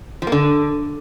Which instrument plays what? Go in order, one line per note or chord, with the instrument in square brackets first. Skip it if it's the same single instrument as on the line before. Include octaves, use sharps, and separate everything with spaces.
[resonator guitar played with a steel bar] F3
A#3
D3